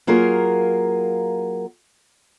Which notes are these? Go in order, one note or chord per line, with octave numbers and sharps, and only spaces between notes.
F#3 A#3 F4 G#4 A#4